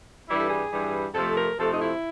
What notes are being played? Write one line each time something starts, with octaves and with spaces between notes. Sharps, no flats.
G2 E3 G3 E4
A4
G#4
G2 E3 G3
F2 C3 F3 A3 A4
A#4
F2 C3 F3 A3 A4
D#4
E4